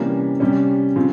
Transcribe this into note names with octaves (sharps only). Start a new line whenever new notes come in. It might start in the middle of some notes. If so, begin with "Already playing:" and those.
Already playing: C3 E3 G3 A#3 C#4
C3 G3 C#4
C#3 F3 C4